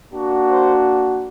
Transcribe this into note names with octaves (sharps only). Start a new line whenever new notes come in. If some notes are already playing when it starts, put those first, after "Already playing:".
A#3 D4 F#4
C5